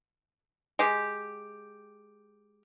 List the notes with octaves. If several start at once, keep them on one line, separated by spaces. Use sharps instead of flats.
G#3 G4